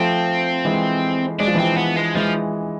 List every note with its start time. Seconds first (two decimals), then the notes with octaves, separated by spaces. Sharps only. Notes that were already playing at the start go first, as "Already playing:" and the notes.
Already playing: F3 A3 C4
0.65 E3 G#3
1.39 G#3 D4
1.47 F3
1.55 E3
1.59 F3 C4
1.77 B3
1.96 G#3
2.15 E3 F3 G#3